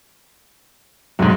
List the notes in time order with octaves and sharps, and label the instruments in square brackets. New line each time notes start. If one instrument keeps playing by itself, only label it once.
[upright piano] F1 G#2 [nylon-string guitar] F#3